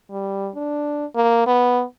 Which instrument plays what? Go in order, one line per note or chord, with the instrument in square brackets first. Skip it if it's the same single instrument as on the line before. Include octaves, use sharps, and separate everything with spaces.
[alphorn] G3
D4
A#3
B3